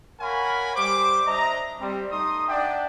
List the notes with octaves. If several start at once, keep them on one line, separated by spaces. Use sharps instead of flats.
A#4 C#5 F5 F#5 G#5 B5
G3 C5 D6
D4 C5 D#5 E5 A#5
G3 C4
A3 D#4 C6 D#6
D4 D5 E5 F#5 G5